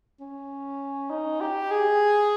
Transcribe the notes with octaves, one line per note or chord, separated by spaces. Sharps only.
C#4
D#4
G4
G#4